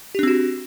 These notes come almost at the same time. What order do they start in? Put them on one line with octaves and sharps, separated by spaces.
G4 D4 C4 F#4